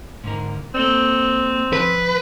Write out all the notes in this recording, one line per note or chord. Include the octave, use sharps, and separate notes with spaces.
G#2 D3 A#4
A#3 C4 A4 D5
F3 B4